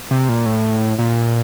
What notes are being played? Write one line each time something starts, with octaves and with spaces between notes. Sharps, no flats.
C3
A#2
A2
A#2